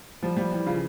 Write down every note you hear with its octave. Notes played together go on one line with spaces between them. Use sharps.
F3 G3
F3 G3
E3 G3
C#3 F4